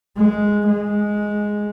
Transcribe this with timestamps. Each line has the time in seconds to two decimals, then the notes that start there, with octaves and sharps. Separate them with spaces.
0.17 G#3
0.67 G#3